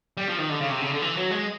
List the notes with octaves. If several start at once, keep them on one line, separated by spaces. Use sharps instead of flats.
G3
F3
D#3
D3
C#3
C3
C#3
D3
E3
F#3
G#3